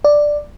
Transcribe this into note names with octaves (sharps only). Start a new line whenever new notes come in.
D5